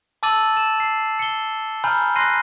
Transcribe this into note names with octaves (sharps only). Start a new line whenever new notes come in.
A5 D6 E6 A6 D#7 F#7
A6 E7
C7
C#7 G7
G#5 A#5 B5 F6 G6
C6 F#6 A#6 C7 D#7